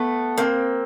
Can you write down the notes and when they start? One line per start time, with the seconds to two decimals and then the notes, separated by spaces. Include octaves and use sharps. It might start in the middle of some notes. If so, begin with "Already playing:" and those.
Already playing: A3 B3
0.38 A#3 C4